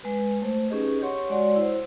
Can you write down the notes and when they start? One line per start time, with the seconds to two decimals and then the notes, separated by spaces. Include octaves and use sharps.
0.04 G#3 B4
0.42 A3 C5
0.70 C#4 D#4 G4 G#4 B4 D#5
1.02 G4 C#5 F#5 C6 C#6
1.30 G#3 F#4 C#5 D5 F#5 C6
1.56 E4 C5